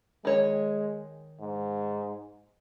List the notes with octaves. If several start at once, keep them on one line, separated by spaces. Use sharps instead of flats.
D#3 G#3 C#5
G#2